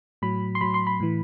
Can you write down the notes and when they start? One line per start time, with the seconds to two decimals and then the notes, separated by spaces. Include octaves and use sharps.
0.22 A2 F#3 B5
0.55 C6
0.61 A2 F#3 B5
0.74 C6
0.87 B5
1.00 A2 E3